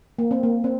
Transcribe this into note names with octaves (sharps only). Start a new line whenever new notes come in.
A#3
C4
A#3
C4